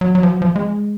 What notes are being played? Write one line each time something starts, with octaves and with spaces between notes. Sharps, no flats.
F#3
F#3
F3
F#3
F3
G#3